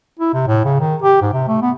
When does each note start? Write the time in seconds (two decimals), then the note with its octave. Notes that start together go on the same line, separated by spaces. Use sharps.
0.19 E4
0.34 C3
0.47 A2
0.65 C#3
0.80 D#3
1.02 G4
1.22 G#2
1.33 C3
1.48 A3
1.62 B3